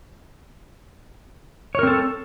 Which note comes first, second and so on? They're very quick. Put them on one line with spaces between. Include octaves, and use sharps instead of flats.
C#5 A#4 C4 A4